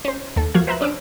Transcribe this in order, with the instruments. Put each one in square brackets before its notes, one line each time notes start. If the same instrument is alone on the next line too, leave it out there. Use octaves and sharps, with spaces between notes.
[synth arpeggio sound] C#4 C5
D#2 A4
F3 A#3 F#4 F5 G#6
B4 C5 E5 A#5 F#6
C#4 D4 D6 E6 F6 D7